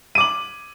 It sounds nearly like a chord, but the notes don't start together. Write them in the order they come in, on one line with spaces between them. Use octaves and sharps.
D#7 D6 F#7